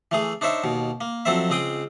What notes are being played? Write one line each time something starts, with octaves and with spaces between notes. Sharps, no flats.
E3 A3 G#4
D4 D#4 C5 C#5 E5
D#2 B2
A#3
F2 F#3 C4 A4 C5 E5
C#2 C4 G#4 G5 D#6